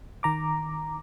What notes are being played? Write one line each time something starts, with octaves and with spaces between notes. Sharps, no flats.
D#3 A#5 D6